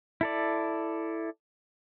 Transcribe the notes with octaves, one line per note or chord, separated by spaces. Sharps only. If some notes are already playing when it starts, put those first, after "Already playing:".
E4 A4 D5